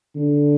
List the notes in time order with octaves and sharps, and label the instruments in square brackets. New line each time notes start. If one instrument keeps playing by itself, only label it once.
[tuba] D3